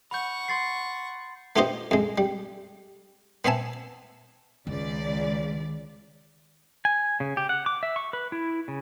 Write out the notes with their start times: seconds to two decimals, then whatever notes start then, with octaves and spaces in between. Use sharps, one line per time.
0.11 F#5 B5 C#6 G6
0.48 C6 A6 C7
1.56 A3 B3 F4 G4 C5 D#5
1.91 F2 G#3
2.18 G3
3.45 B3 C4 E5 G#5 A5
4.67 C#2 D#3 D5
6.85 G#5
7.20 C#3
7.37 G4
7.49 F#5
7.66 D6
7.83 E5
7.96 C#6
8.13 B4
8.32 E4
8.68 C#3